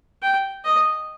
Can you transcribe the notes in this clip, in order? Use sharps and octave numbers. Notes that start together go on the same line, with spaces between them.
G5
D#5